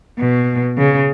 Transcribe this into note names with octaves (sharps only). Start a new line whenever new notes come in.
B2
C#3